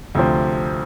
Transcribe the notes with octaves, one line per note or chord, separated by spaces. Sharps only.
D2 C3 F3 C4